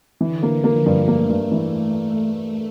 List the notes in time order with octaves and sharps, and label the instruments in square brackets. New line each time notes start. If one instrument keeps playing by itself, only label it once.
[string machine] D3 [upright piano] E3
[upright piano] A#3
[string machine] F3 [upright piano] A#3
[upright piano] G2
[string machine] A3 [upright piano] A#3
[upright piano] G2
E3